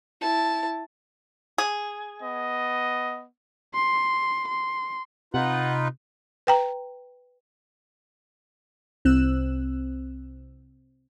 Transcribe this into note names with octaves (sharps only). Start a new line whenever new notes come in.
E4 A5
G#4
B3 D#5
C6
C6
C3 D#4 F4 B4 F#5
B4 G5 A#5
C2 C4 E6 F#6 E7